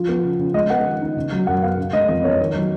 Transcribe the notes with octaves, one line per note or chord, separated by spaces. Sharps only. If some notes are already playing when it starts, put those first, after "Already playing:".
Already playing: F3
B3
C#3
C#3
G#3 D#5
B3 F#5
D#3
D#4
C#3
F#3
F#2 F#5
B3 F5
C#3
G#3 D#5
F2 D#5
B3 C#5
D#3
F#3